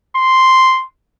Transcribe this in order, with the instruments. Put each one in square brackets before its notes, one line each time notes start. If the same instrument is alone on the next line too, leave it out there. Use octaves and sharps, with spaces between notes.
[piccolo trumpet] C6